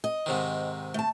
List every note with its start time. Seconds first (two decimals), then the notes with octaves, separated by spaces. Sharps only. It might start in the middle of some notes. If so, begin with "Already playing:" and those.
0.04 D#5
0.26 G#2 C3 D#3
0.94 A3 A5